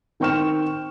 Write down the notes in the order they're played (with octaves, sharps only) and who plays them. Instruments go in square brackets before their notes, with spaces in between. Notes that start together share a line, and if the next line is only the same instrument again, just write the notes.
[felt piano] D#3 C4 G5 C#6 F6 E7